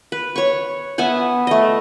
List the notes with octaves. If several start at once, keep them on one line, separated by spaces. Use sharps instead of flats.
B4
C#5 C#6
B3 E5 F#5 G#5
A3 D#5